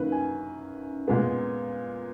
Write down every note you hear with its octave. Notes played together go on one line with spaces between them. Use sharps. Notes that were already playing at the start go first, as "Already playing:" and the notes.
Already playing: F#2 D#3 A#3 B4
G#5
A#2 G#3 B3